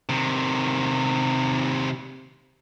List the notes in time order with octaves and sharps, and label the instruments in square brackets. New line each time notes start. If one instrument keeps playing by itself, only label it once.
[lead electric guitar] C3 D#3